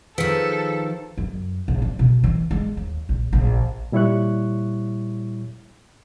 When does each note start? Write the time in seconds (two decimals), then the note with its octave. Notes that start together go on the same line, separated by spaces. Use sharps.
0.18 D#3 F3 G#4 A4 B4 B6 C#7
1.18 F#2
1.68 A#1
1.82 C4
1.99 B2
2.24 E3
2.51 G#3
2.77 D#2
3.09 A#1
3.33 A#1
3.92 A#2 G3 E4 C#5 C#6 F#6